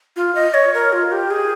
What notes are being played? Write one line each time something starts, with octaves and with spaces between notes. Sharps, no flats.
F4
D#5
C#5
A#4
F4
G4
G#4